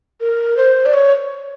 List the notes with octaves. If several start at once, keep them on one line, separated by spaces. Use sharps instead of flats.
A#4
C5
D5
C#5